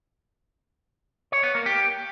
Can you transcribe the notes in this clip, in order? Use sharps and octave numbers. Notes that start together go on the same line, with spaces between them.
C#5
B3
A#3
G4